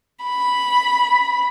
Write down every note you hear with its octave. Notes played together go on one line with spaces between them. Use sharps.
B5